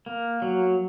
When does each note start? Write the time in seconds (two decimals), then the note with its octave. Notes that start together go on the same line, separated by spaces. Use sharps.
0.06 A#3
0.42 F#3